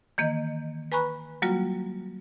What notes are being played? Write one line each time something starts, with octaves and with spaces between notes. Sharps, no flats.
D#3 E3 A#3 D#5
B4 G#5 A#5 B5 C#6 F#6
F#3 G3 A#3 F4 F#4